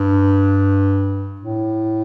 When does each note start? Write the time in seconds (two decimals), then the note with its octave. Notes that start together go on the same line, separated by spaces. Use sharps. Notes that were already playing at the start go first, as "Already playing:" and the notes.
Already playing: G2
1.41 A2